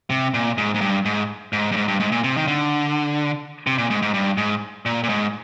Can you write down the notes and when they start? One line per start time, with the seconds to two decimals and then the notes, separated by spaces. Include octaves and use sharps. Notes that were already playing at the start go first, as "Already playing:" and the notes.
0.10 C3
0.34 A#2
0.58 G#2
0.75 G#2
0.81 G2
1.05 G#2
1.53 G#2
1.71 G2
1.76 G#2
1.88 G2
2.00 G#2
2.12 A#2
2.24 C3
2.37 D#3
2.47 D3
3.67 C3
3.78 A#2
3.90 G#2
4.02 G#2
4.14 G2
4.37 G#2
4.86 A#2
5.03 A#2
5.09 G#2